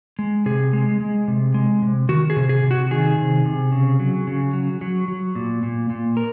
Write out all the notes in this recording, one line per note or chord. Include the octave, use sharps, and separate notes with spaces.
G#3
C3 G#4
G#3
G#3
C3
G#3
C3
D#3 F#4
G#4
C3
G#4
C3
F#4
D#3 G#4
C3
C3
C#3
F#3
C#3
F#3
F#3
F#3
A#2
A#2
A#2
A#4